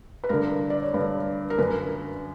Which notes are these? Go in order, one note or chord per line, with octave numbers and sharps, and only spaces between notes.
B4
G2 D3 A#4
D5
C#5
G2 D3 B4
A#4
F#2 D3 B4